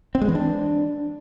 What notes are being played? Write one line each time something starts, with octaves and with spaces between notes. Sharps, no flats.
C4
G#3
E3
D4